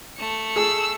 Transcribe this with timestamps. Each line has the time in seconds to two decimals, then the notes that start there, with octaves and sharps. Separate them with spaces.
0.17 A3 C#7
0.56 G#4 E6